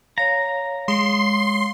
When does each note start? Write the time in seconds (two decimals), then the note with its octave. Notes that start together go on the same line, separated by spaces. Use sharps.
0.18 C#5 F5 A#5
0.88 G#3 C6